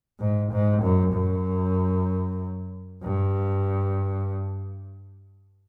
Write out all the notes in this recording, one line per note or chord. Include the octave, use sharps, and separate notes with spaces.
G#2
G#2
F#2
F#2
G2